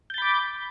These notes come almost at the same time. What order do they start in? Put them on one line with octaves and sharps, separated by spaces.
G6 A6 B5 D6